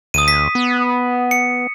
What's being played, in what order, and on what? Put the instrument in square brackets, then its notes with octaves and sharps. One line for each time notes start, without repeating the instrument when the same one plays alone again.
[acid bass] D2 [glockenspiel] D#6 D#7
[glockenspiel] B6
[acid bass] B3
[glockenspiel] C#7